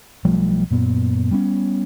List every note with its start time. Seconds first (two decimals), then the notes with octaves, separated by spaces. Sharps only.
0.25 B1 F3 G3 A3
0.71 F#2 A#2 B3
1.31 G3 B3 C#4